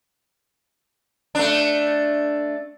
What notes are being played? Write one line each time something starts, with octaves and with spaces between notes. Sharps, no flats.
A3 D4